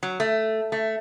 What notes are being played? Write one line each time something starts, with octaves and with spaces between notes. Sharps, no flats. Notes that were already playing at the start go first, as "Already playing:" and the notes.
F#3
A3
A3